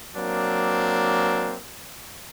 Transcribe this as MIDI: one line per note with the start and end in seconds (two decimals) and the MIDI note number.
0.15 1.55 54
0.15 1.55 58
0.15 1.55 60
0.15 1.55 62